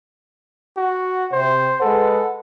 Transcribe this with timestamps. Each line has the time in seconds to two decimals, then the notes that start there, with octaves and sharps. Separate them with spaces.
0.77 F#4
1.32 C3 C5
1.81 G#3 A4 B4 F#5